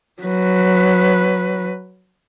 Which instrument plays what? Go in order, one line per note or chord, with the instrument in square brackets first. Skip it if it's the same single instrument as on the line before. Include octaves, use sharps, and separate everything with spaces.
[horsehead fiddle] F#3 B4